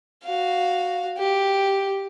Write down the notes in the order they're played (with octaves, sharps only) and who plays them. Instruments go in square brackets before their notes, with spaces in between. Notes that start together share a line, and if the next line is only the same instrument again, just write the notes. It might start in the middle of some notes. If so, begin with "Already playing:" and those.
[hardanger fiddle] F#4 F5
G4